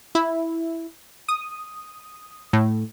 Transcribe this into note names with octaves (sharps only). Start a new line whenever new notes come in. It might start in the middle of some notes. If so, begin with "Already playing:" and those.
E4
D#6
A2